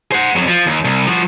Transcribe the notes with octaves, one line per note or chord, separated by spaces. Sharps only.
C5 F#5
F2 F#3
F3
D#2
C2
F3 F#4